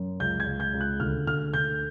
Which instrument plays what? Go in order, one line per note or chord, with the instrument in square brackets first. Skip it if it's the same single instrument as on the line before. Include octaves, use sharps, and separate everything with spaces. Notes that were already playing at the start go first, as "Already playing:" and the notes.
Already playing: [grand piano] F#2
C#2 G6
G#6
C#2
G6
C#2
F#6
D2 F6
D2 F6
D2 G6